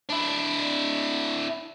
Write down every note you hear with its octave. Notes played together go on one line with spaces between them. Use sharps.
D4 E4